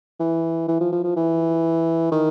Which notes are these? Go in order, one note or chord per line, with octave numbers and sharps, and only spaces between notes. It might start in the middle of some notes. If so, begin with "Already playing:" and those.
E3
E3
F3
F3
F3
E3
D#3